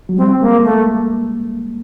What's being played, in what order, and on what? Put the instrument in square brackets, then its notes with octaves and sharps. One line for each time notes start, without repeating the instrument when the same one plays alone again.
[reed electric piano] F#3
[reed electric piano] G3 [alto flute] C4
[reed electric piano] G#3 [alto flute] A#3
[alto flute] A3 [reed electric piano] A#3